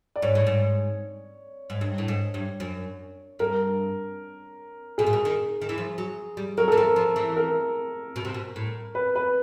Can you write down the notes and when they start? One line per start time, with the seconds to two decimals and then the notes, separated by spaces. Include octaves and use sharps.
0.16 D5
0.22 G#2 C#5
0.35 A2
0.47 G#2
1.70 G#2
1.81 G2
1.98 A2
2.08 G#2
2.34 G2
2.60 F#2
3.39 G2 A#4
4.98 B2 G#4
5.07 A#2
5.13 B2
5.25 D#3
5.62 D#3
5.69 E3
5.78 F3
5.98 F#3
6.37 G3
6.57 F#3 A#4
6.68 E3 A4
6.78 F3 A#4
6.96 F3
7.16 E3
7.37 A#4
8.16 B2
8.25 C3
8.34 B2
8.56 A2
8.95 B4
9.15 B4